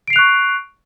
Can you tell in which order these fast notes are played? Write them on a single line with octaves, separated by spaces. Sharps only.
D7 C7 F7 F#6 C#6